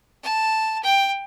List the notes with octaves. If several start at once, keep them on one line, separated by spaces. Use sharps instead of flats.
A5
G5